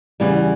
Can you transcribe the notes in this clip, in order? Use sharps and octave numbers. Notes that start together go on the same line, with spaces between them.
E2 C#3 E3 G3